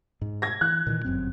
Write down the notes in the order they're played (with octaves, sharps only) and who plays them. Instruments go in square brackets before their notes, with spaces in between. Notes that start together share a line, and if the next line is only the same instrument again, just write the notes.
[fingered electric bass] G#2
[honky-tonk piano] G#6 A#6
[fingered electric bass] E3 [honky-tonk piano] F#6
[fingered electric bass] A#2 D#3 E3
G1 F#2 C4